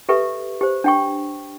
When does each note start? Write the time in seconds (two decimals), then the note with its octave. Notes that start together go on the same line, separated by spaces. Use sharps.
0.09 G4 A4 B4 E5 C#6
0.61 G4 C5
0.84 D4 G5 C#6